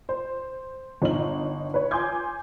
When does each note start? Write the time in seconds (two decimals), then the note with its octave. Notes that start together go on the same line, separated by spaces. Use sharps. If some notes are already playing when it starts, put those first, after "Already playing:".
0.09 C5
1.02 G1 D#4 F#7
1.74 B4 C#5
1.91 G#5 C6 D6 G6 G#6